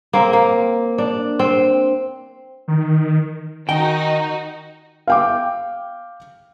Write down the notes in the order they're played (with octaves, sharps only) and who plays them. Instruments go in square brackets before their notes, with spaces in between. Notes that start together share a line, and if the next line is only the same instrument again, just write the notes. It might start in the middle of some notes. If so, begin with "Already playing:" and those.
[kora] A#3 C4
A#3
D4
C4
[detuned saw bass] D#3
[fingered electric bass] D#3 [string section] D#4 F#4 [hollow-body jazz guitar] G5
[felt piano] F5 G5 D6